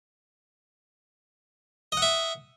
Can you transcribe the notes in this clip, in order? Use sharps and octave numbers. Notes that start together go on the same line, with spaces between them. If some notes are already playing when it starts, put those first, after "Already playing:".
D#5 E5 F#5